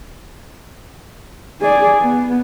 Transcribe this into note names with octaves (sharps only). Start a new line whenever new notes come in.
G#4 D5
B3